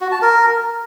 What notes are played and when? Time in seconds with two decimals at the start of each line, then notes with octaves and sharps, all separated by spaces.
0.01 F#4
0.11 A5
0.22 A#4